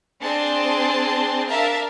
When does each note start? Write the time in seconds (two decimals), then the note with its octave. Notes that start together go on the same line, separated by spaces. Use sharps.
0.21 C4 D4 G#4 C5 A5 C6
1.49 D4 A#4 E5 F5 A5 A#5